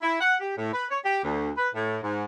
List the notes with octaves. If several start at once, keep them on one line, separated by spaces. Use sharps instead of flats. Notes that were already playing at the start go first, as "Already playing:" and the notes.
E4
F#5
G4
A2
B4
C#5
G4
D2
B4
A2
G#2